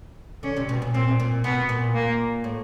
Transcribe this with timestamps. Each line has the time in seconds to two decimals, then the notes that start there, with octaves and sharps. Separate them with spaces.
0.43 D3 C#4
0.57 C3
0.69 B2
0.82 A#2
0.94 A#2 C4
1.20 A#2
1.44 B2 B3
1.69 A#2
1.94 A#3
2.44 A2